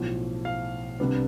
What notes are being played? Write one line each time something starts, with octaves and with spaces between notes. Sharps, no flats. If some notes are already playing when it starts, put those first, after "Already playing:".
Already playing: B1 A2 F3
F5
C2 C3 G3 B3 D4